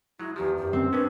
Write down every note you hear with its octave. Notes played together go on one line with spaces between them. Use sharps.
F#3 G#3 E4
E2 D#3 F3 G4
F#2 G4
C4
G#3 B3 C#4 D4 B4